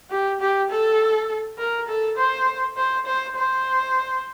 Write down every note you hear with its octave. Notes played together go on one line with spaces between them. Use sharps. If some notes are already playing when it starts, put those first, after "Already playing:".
G4
G4
A4
A#4
A4
C5
C5
C5
C5